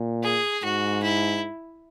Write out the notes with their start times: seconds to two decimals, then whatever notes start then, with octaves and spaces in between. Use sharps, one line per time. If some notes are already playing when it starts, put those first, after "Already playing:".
Already playing: A#2
0.23 G#4
0.64 G#2 F#4
1.03 E4